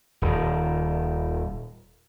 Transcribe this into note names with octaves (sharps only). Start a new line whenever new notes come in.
D#1 D#3